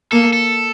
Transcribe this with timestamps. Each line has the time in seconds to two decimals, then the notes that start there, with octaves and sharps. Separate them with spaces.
0.12 A#3 A4
0.33 A4